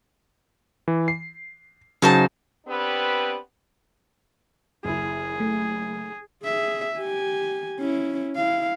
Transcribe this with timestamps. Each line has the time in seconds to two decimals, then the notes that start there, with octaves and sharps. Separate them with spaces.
0.88 E3
1.08 C7
2.02 C#3 F#3 D#4 C5 A5
2.66 B3 C4 D4 G4 B4
4.85 F#1 E4 G#4
5.40 A3
6.44 G#4 E5
6.98 G4 G#5
7.80 C#4 E4
8.36 E4 F5